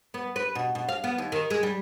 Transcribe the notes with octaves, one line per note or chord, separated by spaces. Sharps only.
B3
B4
B2
B2
F5
B3
D#2
D#3
G#3
G3